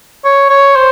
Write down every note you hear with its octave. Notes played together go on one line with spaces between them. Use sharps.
C#5
C#5
C5